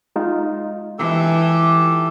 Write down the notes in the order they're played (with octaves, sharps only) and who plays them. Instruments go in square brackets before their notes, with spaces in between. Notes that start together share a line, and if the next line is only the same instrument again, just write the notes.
[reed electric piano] G#3 D#4 F4
[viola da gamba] E3 [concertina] G4 A4